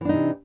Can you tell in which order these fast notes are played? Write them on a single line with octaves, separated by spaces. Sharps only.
E3 D4 D#4 C3